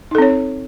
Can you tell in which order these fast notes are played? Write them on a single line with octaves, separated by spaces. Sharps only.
D#4 A4 C4 C#5